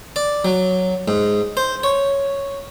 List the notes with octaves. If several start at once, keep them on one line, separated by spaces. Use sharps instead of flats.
D5
F#3
G#2
C5
C#5